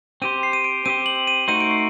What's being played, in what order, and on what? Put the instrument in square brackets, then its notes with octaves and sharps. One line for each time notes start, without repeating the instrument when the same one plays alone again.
[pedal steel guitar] C4 G4 C5 [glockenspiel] D#7
[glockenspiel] C7
D#7
D7
[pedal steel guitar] C4 G4 C5 [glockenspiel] D#7
[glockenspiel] F#7
D#7
[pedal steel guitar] A3 D#4 F#4 C5 [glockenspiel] D#7
[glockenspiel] D7
C7